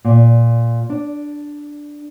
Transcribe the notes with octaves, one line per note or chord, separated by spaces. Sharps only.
A#2
D4